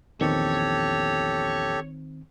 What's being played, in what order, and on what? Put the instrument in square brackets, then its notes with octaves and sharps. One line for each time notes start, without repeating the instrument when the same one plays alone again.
[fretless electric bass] A#1 E2 [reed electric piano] D#3 C4 [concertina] G4 A4 [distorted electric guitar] C#5